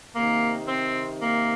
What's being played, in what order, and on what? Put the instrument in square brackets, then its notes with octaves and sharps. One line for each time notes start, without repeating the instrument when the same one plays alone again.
[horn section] C3 D#3 A#3
C4
A#3